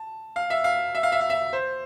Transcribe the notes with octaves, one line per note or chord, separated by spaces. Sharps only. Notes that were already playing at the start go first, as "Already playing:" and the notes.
Already playing: A5
F5
E5
F5
E5
F5
E5
F5
E5
C5